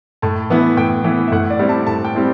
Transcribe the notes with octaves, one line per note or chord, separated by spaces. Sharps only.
A2 A5
E3 B3 E4
A2 G5
E3 B3 E4
E5
A2 F#5
D5
G3 C4 E4
A5
A2 A5
G5
G3 C4 E4